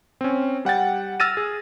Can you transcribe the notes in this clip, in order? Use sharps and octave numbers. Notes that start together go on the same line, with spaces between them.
C4 C#4
G3 F#5 G5 A6
E6 F6 A6 A#6 D#7
G#4